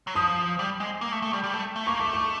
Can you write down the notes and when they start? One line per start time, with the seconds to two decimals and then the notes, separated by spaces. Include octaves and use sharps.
0.07 F#3
0.16 F3 D#6
0.59 G3
0.80 G#3
1.01 A#3
1.12 A3
1.22 A3
1.33 G3
1.44 G3
1.54 A3
1.76 A3
1.87 A#3 C#6
1.99 A3 D6
2.13 C#6